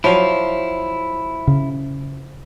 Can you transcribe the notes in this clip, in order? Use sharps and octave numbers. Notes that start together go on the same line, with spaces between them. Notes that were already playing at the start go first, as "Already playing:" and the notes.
F3 F#3 E4 F5
C#3